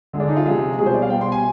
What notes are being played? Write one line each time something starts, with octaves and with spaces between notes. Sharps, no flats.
D3 G#3
D4
D#4
F4
C3 F3 G#3 G4
B2 G3 G#4
C5
D5
F5
B2 G3 G5
C6
G#5